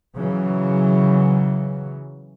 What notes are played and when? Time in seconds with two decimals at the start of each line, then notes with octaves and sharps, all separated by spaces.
0.16 C#3 E3 F#3